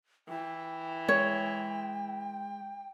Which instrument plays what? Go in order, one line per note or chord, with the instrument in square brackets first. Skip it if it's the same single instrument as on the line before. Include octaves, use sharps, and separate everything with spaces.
[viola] E3 [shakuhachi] G5
[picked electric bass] G#3 [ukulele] C#5